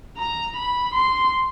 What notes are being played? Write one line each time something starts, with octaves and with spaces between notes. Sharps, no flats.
A#5
B5
C6